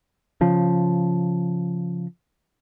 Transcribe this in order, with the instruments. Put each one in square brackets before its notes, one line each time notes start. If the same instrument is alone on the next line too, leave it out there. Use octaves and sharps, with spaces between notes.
[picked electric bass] C#3 F3